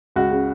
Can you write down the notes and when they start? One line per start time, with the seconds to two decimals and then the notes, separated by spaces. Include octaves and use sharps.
0.16 C#2 F#4
0.31 C#3